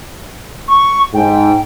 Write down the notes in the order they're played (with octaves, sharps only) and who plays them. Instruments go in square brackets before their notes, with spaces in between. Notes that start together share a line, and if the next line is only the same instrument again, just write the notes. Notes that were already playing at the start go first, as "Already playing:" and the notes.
[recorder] C#6
[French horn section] G#2 [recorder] G5